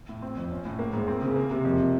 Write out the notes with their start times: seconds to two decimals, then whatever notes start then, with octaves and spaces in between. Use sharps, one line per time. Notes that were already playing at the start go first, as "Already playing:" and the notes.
0.09 A2
0.22 C4
0.37 F2
0.52 C#4
0.65 A2
0.79 A#3
0.93 G#2
1.08 C4
1.22 C#3
1.36 A#3
1.51 C3
1.64 F2